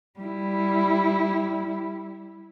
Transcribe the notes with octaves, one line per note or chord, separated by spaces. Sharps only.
G3 E4